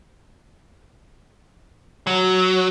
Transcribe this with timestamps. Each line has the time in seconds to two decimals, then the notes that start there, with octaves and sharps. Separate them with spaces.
2.07 F#3